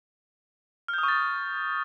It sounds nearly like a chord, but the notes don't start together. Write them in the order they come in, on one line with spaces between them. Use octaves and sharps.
F6 G6 D#6 C#6 A6